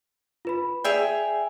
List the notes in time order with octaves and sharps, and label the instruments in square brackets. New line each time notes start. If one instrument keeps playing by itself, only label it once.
[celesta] F4 B4 B5
[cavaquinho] G#4 E5 G5 [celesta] D5 D7 F7